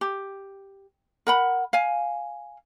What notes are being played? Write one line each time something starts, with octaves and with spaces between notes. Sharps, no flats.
G4
A#4 F#5 B5
F5 G#5